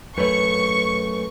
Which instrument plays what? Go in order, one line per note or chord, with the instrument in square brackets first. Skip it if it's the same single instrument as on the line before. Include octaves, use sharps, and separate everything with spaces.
[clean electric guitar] F#2 A3 [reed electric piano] B4 C#5 [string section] C#6